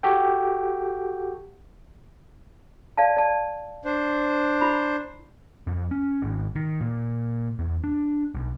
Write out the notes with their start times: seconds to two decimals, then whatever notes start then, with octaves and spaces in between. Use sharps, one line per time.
0.03 F#4 G4 A4 G5
2.97 D5 F5 A5
3.17 D5 A5
3.85 D4 C5
4.61 E4 B5
5.67 F2
5.91 C#4
6.22 G#1
6.55 D#3
6.81 A#2
7.59 E2
7.84 D4
8.35 B1